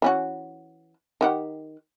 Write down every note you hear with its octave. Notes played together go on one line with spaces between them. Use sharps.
E3 C#4 F#4
D#3 G4 F#5